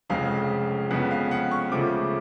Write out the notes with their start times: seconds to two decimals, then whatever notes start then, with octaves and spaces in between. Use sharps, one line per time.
0.09 F1 F2 C#3 G#3 F5
0.91 F2 C#3 G#3 B3 F#5
1.11 F5
1.31 F#5
1.51 C#6
1.72 C#2 C#3 F3 A3 D6